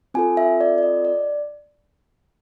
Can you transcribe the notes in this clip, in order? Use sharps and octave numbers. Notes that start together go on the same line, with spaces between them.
C4 F4 A4 G#5
E5
D5
D5
D#5
D5